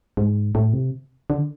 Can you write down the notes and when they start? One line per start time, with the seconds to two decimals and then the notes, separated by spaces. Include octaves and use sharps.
0.17 G#2
0.55 A2
0.73 C3
1.30 D3